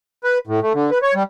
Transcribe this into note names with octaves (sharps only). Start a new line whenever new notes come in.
B4
A2
A3
D3
B4
C#5
G3